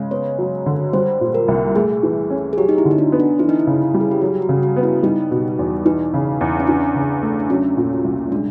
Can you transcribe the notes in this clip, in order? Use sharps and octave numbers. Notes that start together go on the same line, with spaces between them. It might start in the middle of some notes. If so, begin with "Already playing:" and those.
Already playing: C#3 G#3
B3 C#5
F#3
D3
G3 C5
A#2
A#4
C2
A3 G#4
E3
C#4
G#4
F#3 G4
D#4
E4
D3
D#4
D4
B3
D4
E3 E4
D#4
E4
C#3
G3
G#4
G4
F#3 F#4
F#4
C#3
F#4
B3
E4
G3 D#4
B2
E2
E3 D#4
C#3
E2
C#4
E3 D4
C#3
A3
D4
F#3 C#4
A#2
C2
G#3 D4